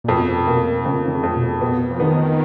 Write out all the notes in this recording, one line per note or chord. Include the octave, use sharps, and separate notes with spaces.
A#2
F2 B2
B2 A#3
F2 C#3
D#3
C#3
F2
B2
B2 B3
F3
D#3 B3